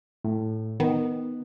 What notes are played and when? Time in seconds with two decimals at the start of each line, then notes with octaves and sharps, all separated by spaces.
0.24 A2
0.80 D#3 B3